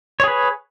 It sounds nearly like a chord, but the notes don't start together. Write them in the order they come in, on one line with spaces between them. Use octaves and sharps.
C#5 G#4 B4